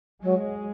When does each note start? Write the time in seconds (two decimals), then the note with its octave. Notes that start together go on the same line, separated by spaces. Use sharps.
0.22 F#3 G#3